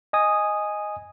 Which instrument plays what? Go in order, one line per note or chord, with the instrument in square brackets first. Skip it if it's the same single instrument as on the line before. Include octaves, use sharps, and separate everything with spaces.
[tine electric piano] D#5 G#5 D#6